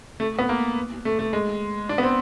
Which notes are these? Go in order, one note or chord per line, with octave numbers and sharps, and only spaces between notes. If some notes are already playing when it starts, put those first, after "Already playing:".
A3
B3
A#3
A3
A3
G#3
D4
B3
C4